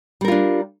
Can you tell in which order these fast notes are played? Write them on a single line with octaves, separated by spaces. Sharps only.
G3 A#4 F4 D4